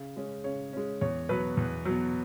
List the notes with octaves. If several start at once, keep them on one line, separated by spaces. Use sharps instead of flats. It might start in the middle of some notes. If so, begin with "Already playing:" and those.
Already playing: C#3
G#3 C#4
C#3 C#5
G#3 C#4
E2 C#5
B2 F#3 B4
E2
B2 F#3